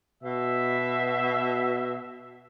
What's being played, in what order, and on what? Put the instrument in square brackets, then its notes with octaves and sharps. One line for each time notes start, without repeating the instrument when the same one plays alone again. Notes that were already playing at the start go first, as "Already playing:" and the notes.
[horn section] B2 E5